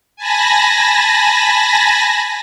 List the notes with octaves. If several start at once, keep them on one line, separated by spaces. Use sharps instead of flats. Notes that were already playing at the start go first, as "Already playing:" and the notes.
G#5 A5 B5 A#6